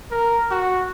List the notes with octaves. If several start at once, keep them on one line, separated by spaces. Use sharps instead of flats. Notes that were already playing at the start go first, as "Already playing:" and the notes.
A#4
F#4